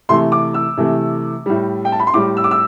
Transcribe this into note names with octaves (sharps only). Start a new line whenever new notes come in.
C3 E3 A3 C6
D6
E6
C3 E3 A3
A2 G3
G5
A5
B5
C6
A2 G3 D6
E6
D6
E6